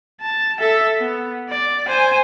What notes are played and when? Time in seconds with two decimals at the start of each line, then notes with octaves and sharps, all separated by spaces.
0.21 A5
0.60 A4 E5
0.99 B3
1.49 D5
1.88 C5 G#5